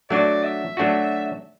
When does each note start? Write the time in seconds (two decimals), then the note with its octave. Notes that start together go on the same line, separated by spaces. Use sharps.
0.10 F#3 A3 D4 F#4 D5
0.44 E5
0.77 F#3 A3 D4 F#4